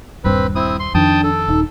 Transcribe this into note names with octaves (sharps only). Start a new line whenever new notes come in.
D#1 G2 C4 B4
C4 E4 D#6
C6
F2 D#3 D4 G5 A5 D#6
A4
D#1 D#4